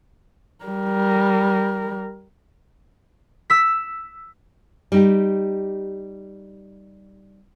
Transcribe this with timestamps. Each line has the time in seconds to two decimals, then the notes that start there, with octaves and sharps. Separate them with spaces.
0.65 G3 A#4
3.50 E6 B6
4.92 G3 D#4 G4